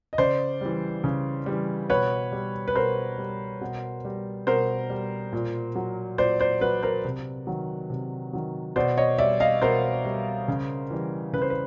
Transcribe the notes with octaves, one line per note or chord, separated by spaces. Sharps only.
D#5
C#3 C5 D5
E3 G3
C#3
E3 G3
B2 B4 C#5
G3
B4
B2 A#4 C5
G3
B2
G3
B2 A#4 C5
G3
A#2
F#3
A#2 C5 D5
C5 D5
F#3 B4
A#4 C5
C3
D#3 F#3
C3
D#3 F#3
B2 C5 D5
C#5 D#5
G3 D5 E5
D#5 F5
B2 A#4 C5
G3
C#3
E3 G3
C#3 B4
C5
B4